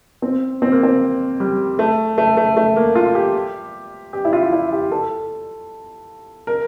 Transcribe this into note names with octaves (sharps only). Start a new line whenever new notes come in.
C4
C4
A#3
C4
G3
A3
A3
A3
A3
A#3
F4
G4
G4
E4
F4
E4
G4
A4
A#4